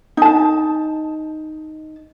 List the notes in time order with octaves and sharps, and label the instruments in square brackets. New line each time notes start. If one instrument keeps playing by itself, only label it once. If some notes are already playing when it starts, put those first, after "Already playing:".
[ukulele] D#4 A5